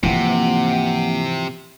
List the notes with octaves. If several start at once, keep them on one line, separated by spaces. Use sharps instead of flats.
G#2 C3 E3 F3 A#3 C4 F#5